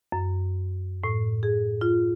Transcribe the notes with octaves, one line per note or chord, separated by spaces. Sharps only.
F#2
A2
G#4
F4